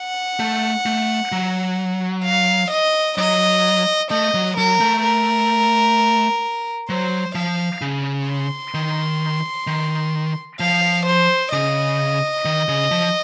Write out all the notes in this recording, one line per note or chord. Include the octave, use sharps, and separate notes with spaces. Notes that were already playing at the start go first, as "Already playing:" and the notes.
Already playing: F#5
A3
A3
F#3
F5
D#5
F#3 D#5
A3 D#5
F#3
F#3 A#4
A3
A#4
F#3 C5
F3 F5
C#3
C6
D#3
D#3
F3 F5
C5
C#3 D#5
D#3
C#3
F3